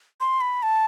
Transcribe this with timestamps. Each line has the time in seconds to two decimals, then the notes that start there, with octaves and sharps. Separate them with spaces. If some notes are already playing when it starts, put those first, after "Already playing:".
0.21 C6
0.41 B5
0.63 A5